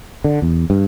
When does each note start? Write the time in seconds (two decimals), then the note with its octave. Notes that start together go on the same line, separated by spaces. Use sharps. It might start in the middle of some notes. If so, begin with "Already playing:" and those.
0.24 D3
0.42 E2
0.70 G2